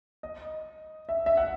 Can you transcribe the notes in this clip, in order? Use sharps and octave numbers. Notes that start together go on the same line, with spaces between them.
D#5
E5
E5
F#5